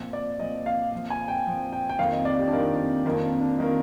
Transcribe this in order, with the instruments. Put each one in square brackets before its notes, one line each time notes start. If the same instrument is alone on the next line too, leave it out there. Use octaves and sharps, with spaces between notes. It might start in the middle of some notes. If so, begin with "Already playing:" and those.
Already playing: [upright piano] A#2 F3 C4
[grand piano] D5
[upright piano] A#2 F3 C4 [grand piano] D#5
[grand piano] F5
[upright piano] A#2 F3 C4
[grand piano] G#5
G5
[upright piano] A#2 F3 C4
[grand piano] G5
G5
[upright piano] F2 D#3 A#3 F4 A#4 [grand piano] F5
[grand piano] D#5
D5
G4
D4
[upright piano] F2 D#3 A#3 F4 A#4 [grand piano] D#4
[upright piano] F2 D#3 A#3 F4 A#4 [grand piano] D#4
[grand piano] D4
D4
[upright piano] D#3 A#3 F4 A#4 [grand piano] D#4